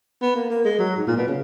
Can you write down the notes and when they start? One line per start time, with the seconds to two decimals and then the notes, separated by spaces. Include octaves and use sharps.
0.22 B3
0.36 A#3
0.50 A#3
0.65 G#3
0.79 F#3
0.97 G#2
1.07 A#2
1.17 B2
1.28 C#3